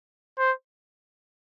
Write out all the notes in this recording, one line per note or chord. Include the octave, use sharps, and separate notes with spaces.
C5